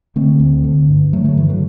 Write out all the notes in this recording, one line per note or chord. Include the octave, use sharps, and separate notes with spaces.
D3 A3 C4
D2
D3
G2
D3 F#3 A3
F#3 A3
G2 E3
D3 F#3